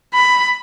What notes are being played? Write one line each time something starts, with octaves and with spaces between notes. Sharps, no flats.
B5